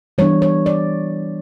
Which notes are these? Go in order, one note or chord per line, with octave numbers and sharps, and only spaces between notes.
E3 G3 B3 D4 C#5
C#5
D5